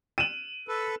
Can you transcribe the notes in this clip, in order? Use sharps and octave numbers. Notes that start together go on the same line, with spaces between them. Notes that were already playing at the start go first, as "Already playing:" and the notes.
D#7 E7 F#7
A4 B4